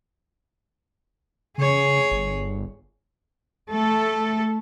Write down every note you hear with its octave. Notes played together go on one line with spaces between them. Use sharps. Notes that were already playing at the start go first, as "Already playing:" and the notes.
C#3 G#4 C#5
G1
A3 A4